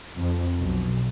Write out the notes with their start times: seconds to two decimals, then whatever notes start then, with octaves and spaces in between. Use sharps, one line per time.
0.19 F2
0.61 B1